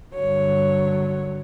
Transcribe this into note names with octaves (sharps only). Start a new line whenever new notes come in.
G2 D3 F#3 C#5